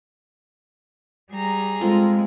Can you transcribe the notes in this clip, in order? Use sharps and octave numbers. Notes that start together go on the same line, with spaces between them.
G3 G#4 A#5
G#3 C4 F4 A4